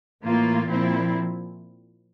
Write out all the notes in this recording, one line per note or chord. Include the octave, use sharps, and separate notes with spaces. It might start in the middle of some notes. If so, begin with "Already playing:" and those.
A2 E3 A#3 F4
A#2 F3 C4 E4